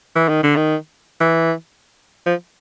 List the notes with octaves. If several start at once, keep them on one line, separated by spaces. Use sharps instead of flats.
E3
D#3
D3
D#3
E3
F3